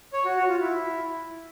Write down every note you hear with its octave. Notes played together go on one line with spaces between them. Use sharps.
C#5
F#4
F#4
F4
E4